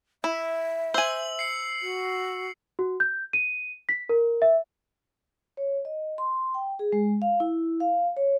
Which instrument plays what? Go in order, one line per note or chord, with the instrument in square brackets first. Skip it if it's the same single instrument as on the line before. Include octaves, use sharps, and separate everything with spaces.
[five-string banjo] E4 [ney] E5
[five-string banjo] C5 G#5 [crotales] E6 F#7
[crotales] C7 C#7
[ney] F#4
[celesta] F#4
G6
D#7
B6
A#4
E5
[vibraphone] C#5
D#5
C6
G5
G#4
G#3
F5
E4
F5
C#5